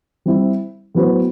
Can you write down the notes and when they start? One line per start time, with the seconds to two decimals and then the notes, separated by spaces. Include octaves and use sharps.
0.26 G3 C4 E4
0.95 A2 F#3 B3 F#4 C5